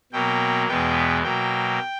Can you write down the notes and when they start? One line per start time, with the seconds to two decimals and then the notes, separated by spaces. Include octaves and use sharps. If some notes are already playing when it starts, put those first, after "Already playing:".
0.12 B2 F#3 A#3 G5
0.68 E2 B2 G#3 B3 G5
1.23 B2 F#3 A#3 G5